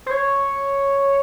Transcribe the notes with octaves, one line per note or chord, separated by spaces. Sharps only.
C5
C#5